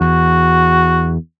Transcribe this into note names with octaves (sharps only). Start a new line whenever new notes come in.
E2 F#4